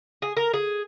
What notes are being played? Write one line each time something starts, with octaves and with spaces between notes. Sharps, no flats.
G#4
A#4
G#4